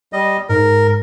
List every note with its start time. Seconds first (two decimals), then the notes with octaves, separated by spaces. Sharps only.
0.13 G3 D#5
0.49 G#2 A#4